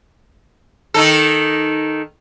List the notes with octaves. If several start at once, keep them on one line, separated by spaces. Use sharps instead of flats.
D#3 D#4 A4